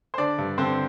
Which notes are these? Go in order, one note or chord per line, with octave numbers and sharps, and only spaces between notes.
C5
D3 D4 D5
G2
D3 C4 C5